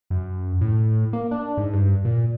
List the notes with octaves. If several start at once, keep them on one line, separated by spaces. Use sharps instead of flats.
F#2
A2
A#3
D4
G#2
G2
A#2